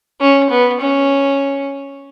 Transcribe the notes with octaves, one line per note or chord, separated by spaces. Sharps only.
C#4
B3
C#4